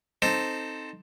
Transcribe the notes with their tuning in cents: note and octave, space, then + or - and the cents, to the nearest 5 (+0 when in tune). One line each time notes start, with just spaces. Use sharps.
C4 +0 D#4 +0 A4 +5